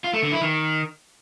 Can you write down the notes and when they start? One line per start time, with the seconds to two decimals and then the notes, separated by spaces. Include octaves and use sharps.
0.04 F4
0.13 A3
0.23 D3
0.32 E4
0.41 D#3